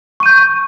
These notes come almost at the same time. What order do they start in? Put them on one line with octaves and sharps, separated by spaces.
C#6 D#7 G6